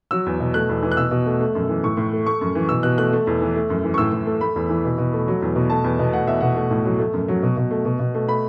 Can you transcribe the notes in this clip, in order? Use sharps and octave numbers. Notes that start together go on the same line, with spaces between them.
F#3 E6
E2
B2
A3 F#6
E2
E3
F#6
B2 E6
B2
A3
A3
F#2
E3
A2 C#6
A2
A3
A3 C#6
F#2
E3
B2 E6
B2 F#6
A3 F#6
A3
E2
E3
A3
F#2
E3
C#6
A2 E6
A2
A3
A3 B5
E2
E3
B2
B2
A3
F#3
E2
B2
A3 A5
E2
B2
A3 F#5
E2 E5
B2 F#5
A3
A2
F#3
A3
F#2
F#3
B2
B2
A3
B2
B2
A3
A3 B5